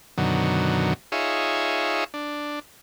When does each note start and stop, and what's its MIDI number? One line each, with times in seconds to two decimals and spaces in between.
0.18 0.94 42
0.18 0.94 47
0.18 0.94 50
0.18 0.94 51
0.18 0.94 54
1.12 2.04 63
1.12 2.04 65
1.12 2.04 68
1.12 2.04 73
1.12 2.04 76
2.14 2.59 62